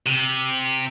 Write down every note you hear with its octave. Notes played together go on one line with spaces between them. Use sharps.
C3